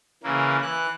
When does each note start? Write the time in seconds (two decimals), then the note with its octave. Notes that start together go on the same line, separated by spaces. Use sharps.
0.23 C#3 E3 A#3
0.62 E3 F#6